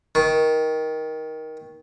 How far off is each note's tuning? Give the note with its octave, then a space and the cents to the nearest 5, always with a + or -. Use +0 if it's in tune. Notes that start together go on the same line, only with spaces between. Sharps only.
D#3 +15